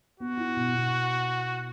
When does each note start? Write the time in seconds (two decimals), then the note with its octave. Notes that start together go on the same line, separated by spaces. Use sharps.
0.20 B3 F#4
0.37 E4
0.56 B2
0.74 B2